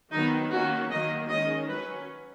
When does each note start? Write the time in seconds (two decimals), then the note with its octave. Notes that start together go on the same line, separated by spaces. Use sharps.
0.12 D#3 F#3 B3 D#4
0.51 D#3 A#3 C#4 F#4
0.91 D#3 F#3 A#3 D#5
1.30 D#3 G#3 C#4 D#5
1.69 F#3 C#4 B4